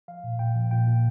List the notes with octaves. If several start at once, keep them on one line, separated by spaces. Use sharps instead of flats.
F3 F5
A#2
A#2 G5
F3
A#2 G5
A#2